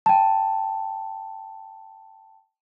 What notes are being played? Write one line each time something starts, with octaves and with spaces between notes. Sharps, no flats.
G5 A5